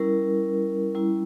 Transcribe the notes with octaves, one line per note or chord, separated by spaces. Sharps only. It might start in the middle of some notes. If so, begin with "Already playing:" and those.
Already playing: G3 C#4 E4 A#4
G3 C#4 E4